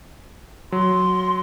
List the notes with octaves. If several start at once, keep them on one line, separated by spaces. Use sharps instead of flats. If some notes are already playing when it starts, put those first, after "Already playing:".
F#3 C6